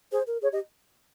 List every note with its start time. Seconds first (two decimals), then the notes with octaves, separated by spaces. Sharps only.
0.12 G#4 C5
0.27 A#4
0.42 G#4 C#5
0.52 G4 D#5